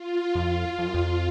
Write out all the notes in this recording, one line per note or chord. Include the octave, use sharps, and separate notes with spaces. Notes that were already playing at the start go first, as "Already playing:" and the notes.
Already playing: F4
F2
F2
F#2
F2